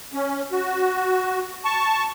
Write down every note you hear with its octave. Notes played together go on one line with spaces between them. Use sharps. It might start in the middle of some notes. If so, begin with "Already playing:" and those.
C#4
F#4
A5 C#6